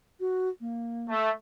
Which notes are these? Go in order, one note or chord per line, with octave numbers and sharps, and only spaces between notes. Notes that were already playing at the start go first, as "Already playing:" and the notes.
F#4
A#3
A3